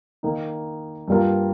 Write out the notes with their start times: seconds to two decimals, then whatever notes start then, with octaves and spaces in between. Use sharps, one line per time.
0.23 D#3 A#3 D#4
1.08 G2 G3 A#3 F4 A#4